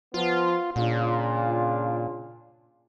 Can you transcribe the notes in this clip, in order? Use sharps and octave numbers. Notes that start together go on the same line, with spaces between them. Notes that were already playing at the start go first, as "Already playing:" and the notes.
F3 B3 F4
A#2 C#3 D4 F4